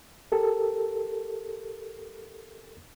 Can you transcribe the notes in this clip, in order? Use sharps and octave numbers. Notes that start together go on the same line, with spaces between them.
G4 A4 A#4